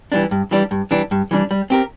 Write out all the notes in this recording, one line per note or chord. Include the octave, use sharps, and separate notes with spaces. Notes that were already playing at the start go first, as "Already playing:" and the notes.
E3 G3 D4
G2
E3 G3 D4
G2
E3 G3 D4
G2
E3 G3 D4
G3
C4 G4 A#4